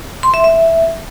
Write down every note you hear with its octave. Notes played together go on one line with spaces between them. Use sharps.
C6
E5
E5